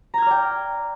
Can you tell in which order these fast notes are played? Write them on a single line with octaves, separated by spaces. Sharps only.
A#5 G#6 F6 D5 G5